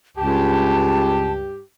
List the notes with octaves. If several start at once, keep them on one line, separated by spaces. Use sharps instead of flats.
C#2 G2 G4 A5